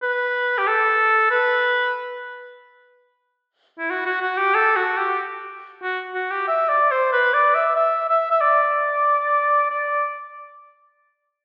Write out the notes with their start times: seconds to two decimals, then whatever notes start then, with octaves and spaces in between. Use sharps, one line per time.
0.02 B4
0.58 G4
0.67 A4
1.31 B4
3.79 E4
3.90 F#4
4.06 F#4
4.22 F#4
4.37 G4
4.55 A4
4.76 F#4
4.97 G4
5.83 F#4
6.15 F#4
6.31 G4
6.48 E5
6.69 D5
6.91 C5
7.12 B4
7.34 D5
7.55 E5
7.76 E5
8.09 E5
8.31 E5
8.41 D5
9.70 D5